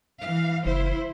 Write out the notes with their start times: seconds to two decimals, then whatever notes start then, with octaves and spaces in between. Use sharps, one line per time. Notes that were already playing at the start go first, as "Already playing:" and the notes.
0.21 E3 F5
0.66 F#1 E4 C5